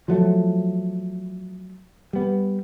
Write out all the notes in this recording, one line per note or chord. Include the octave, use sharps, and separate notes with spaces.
F3 F#3 A3
G3 B3